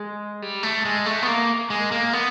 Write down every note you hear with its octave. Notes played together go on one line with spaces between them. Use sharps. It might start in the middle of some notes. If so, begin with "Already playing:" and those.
Already playing: G#3
G3
A3
G#3
A3
B3
A#3
G#3
A#3
B3